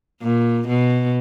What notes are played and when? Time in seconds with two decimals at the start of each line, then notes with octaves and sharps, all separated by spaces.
0.21 A#2
0.68 B2